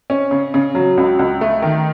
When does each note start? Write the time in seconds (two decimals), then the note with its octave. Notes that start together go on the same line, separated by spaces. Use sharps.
0.10 C#4
0.31 C#3
0.54 C#3
0.75 F#3
0.97 C#2
1.19 C#2
1.41 A3
1.62 D#3